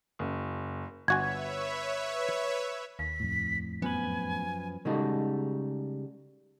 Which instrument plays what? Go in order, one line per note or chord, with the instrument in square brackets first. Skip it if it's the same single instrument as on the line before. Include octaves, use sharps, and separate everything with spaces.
[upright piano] F#1
[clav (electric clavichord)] G1 F#4 G#5 [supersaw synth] B4 C#5 E5 [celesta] G#6
[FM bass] D#2 [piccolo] B6
[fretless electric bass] F2 A2
[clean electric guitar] F#2 F3 B4 [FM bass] B3 [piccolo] G#5
[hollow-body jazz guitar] C#3 G3 G#3 D#4 F#4 A4